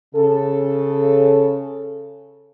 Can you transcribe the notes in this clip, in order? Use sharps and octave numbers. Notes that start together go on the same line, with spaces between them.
C#3 A4